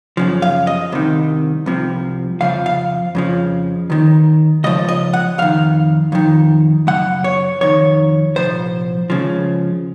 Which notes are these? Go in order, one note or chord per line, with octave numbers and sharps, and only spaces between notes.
F#2 C#3 F3
F5
D#5
C2 C3 D#3
C2 C3 F3
F2 C#3 F3 F5
F5
F2 C#3 F3
D#2 D#3
C#2 C#3 F3 D#5
D#5
F#5
F2 D#3 F5
F2 D#3
F#2 C#3 F#5
C#5
F2 D#3 C#5
C2 A#2 F3 C5
C#2 C#3 F3